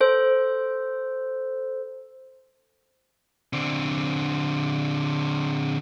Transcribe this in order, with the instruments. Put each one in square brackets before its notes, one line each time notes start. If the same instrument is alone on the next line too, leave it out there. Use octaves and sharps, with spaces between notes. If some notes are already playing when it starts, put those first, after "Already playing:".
[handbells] A4 C5
[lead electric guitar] D3 C4